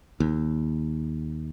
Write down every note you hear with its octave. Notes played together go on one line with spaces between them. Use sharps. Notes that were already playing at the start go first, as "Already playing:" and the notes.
D#2